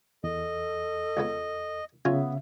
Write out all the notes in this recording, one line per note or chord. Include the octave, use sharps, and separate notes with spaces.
E2 A4 D#5
C#2 C#3 B3
C#3 F#3 B3 C#4 F4 E5